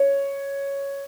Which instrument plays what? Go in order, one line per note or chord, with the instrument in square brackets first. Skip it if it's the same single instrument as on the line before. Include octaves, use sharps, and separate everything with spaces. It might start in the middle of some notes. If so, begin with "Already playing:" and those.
Already playing: [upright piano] C#5